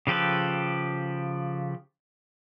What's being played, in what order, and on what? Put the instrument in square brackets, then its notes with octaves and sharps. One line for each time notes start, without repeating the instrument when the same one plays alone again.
[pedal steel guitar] C#3 F3 G4 A4 B4